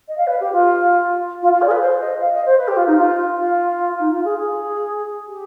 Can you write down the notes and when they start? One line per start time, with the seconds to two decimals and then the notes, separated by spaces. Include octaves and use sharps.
0.08 D#5
0.17 F5
0.27 B4
0.40 G4
0.53 F4
1.42 F4
1.53 F4
1.62 D5
1.67 G#4
1.71 B4
1.81 C5
2.00 D#5
2.19 F5
2.33 D#5
2.45 C5
2.58 B4
2.68 G4
2.77 F4
2.87 D#4
2.97 F4
3.36 F4
4.00 D#4
4.11 F4
4.25 G#4
4.38 G#4
5.28 G4